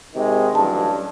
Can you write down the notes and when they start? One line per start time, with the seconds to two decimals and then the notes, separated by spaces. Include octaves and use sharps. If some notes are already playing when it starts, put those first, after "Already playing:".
0.15 C3 D#3 G#3
0.55 A1 G2 F#3 A5